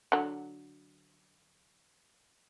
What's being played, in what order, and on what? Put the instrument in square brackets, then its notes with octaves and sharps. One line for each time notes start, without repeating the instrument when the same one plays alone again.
[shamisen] D3 F#3